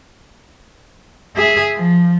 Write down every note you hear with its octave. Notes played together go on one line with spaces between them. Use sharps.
G#4 E5
F3